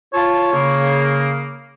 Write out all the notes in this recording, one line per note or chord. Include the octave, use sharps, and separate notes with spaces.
F4 C#5 A5
C#3 A#3